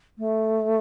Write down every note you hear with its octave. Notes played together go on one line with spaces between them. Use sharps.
A3